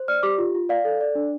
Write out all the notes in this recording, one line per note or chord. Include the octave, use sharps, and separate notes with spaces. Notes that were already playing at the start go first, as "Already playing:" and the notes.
Already playing: C5
D5 F6
G4 D6
F4
F4
D5 F5
A4
D5
D4